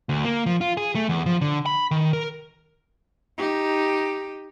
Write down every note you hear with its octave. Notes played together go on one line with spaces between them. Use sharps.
D2
A#3
F3
F4
G#4
A3
E2
F3
D3
B5
D#3
A#4
D#4 G4